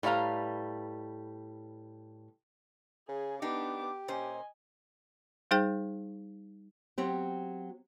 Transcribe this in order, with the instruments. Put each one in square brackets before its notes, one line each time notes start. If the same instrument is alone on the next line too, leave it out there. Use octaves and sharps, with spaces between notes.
[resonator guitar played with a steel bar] A2 G3 B4 F5 A#5
[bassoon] C#3 [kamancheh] G#4
[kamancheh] B3 D6 [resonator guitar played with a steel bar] D4 D#4 [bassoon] G4
[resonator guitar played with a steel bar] A#2 C#4 C5 [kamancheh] D#5 G#5
[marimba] G3 D#4 G#4 C5 G5 G6
[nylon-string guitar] F#3 C4 G4